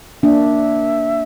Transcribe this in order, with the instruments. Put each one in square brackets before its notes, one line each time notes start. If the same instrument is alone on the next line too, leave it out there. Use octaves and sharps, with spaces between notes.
[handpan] A#3 D4 [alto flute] E5